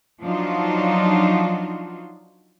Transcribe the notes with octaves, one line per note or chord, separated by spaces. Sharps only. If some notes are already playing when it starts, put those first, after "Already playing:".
F3 F#3 D4 D#4 F4 F#4